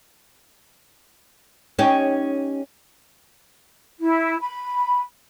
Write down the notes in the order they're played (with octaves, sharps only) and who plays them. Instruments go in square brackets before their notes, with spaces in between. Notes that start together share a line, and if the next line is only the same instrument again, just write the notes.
[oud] C#4 D#4 G4
[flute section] E4
B5